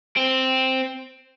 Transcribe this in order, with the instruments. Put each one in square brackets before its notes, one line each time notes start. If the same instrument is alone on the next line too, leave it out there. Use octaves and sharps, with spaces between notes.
[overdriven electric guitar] C4